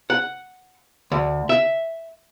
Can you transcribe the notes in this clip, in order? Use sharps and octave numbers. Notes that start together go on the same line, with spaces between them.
F#5
D2
E5